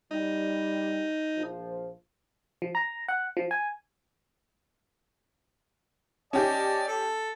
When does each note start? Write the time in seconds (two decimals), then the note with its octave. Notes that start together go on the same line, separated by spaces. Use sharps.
0.11 G3 D#4
1.35 A#1 F3
2.62 F3
2.75 A#5
3.08 F#5
3.37 F3
3.51 G#5
6.33 C#4 G4 D5 D#5 A5
6.87 A4